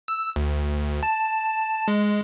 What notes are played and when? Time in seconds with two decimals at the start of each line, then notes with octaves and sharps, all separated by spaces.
0.08 E6
0.36 D2
1.03 A5
1.88 G#3